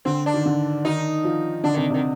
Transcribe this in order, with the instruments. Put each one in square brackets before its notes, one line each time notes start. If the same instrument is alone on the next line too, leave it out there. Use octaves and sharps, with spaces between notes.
[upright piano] D3 [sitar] C4
[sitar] D4
[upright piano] D#3
D3
[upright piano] D#3 [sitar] D#4
[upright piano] F3
[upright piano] D3 [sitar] D4
[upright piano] C3 [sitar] D#3
[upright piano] C3 [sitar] D#3